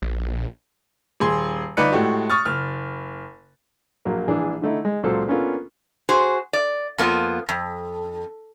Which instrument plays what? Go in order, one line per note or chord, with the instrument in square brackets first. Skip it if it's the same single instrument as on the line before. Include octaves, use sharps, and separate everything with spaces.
[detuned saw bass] A#1
[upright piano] D#1 G#4 C6
G1 D#4 B4 D5 F#6 C#7
A2 G#3 A3 F#4 G4
C#6 D#6 F6 A6
F#1 F6
[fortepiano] A#1 F#3 A#3
A#1 E3 D4 G#4
D3 A3 D#4 E4
G#3
C#2 A#2 F#3 A4 C5
A#3 B3 C#4 D4 F4 A4
[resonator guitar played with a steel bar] F#4 G#4 C5
D5
F2 A#3 B3 D4 F4
F2